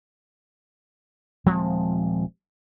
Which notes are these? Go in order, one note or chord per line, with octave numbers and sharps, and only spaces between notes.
D#1 F3 G#3 C4